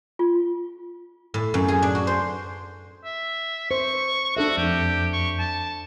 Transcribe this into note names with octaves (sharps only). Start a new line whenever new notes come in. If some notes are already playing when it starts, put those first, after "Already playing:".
F4
A2
F#2
G#4
D4
F#4
C5
E5
C5 C#6
D4 F#4 A4 E5
F2 G4
C#6
A5